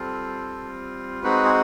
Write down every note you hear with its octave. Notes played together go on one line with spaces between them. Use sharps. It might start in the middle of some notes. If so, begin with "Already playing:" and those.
Already playing: G3 C4 F4 A4
G#3 C4 D#4 F#4 B4
G#4